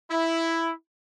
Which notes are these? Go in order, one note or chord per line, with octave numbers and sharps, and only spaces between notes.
E4